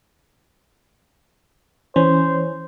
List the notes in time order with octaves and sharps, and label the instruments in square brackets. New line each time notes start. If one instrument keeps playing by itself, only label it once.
[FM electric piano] E3 C#4 [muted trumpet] C5